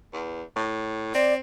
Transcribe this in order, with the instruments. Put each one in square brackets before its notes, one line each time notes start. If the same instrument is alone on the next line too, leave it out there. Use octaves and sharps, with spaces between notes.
[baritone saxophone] E2
A2
[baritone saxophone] C4 [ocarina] D5